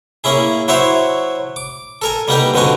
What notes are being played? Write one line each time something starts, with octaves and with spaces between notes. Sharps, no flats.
A#3 C#4 E4 G#4
F#3 E4 F#4 C5 C#5 E5
D6
A4 A#4 G#5
G3 A#3 B3 D#4 G4 G5
F2 D3 B3 D#4 F#4 G#5